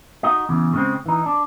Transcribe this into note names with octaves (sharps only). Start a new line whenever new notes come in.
D#4 F#4 D#5
E2 C#3
C#3 G#3 C4
E3 D#4
D4